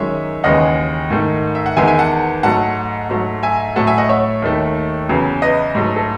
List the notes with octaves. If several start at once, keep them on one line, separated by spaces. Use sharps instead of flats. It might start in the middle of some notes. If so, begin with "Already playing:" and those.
Already playing: F#2 D#3 G#3 C#5 E5
D#2 C#3 E3 G#3 D#5 F#5
G#2 D#3 A3
E5
F#5
E2 D#3 G#3 E5 G#5
E5 G#5
F#5 A5
G#2 F#3 A3 F#5 A5
G#2 F#3 A3
E5 G#5
A2 F#3 A3 F#5 A5
E5 G#5
D#5 F#5
C#5 E5
D#2 D#3 A3
E2 C#3 F#3
B4 D#5
G#2 F#3 A3
A4